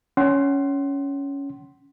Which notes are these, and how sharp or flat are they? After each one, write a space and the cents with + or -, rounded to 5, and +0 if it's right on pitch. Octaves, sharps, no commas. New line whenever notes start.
C#4 +10 F#5 +35 C6 +5